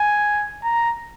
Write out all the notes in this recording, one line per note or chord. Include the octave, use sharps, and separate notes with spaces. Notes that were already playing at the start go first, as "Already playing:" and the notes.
Already playing: G#5
A#5